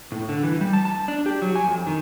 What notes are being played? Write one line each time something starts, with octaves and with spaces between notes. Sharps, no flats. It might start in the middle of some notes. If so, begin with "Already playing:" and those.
A2
D3
E3
G3
A5
A5
D4
G4
F#3
G#5
F2
D#3